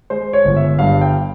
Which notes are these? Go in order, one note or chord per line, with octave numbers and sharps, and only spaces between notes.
G#3 C5
C#5
G1
E5
G2 F5
G5